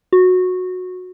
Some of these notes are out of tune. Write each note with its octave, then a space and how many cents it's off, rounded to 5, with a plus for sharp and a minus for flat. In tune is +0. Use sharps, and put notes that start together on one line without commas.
F#4 -15